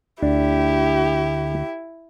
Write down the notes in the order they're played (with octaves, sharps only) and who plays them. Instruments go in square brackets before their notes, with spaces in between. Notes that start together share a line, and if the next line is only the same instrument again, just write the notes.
[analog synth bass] D2 [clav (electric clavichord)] D4 [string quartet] E4 [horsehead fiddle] G4